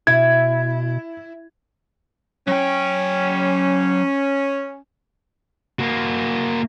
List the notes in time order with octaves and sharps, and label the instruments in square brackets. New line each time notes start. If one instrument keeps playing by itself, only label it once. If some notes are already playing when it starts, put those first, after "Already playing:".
[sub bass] B2 [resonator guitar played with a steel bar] E4 [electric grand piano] G#6
[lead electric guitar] F#3 G5 [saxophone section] C#4
[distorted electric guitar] A#3 F#4